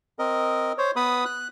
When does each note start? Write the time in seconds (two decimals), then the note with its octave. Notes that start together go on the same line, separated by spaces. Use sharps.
0.19 C4 A#4 D#5
0.78 C5 C#5
0.96 B3 B4 B5 D#6
1.25 F#6